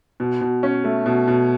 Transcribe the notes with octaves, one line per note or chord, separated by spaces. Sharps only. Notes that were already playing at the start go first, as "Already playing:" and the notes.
B2
B2
C#4
A3
B2
B2